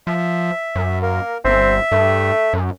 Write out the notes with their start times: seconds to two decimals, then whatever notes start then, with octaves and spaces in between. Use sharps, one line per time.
0.07 F3 E5
0.76 F#2
1.02 A#3 A#4
1.45 G1 C4 E5
1.92 G2 A3
2.53 F#2